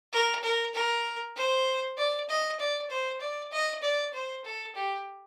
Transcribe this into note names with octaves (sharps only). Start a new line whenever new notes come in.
A#4
A#4
A#4
C5
D5
D#5
D5
C5
D5
D#5
D5
C5
A4
G4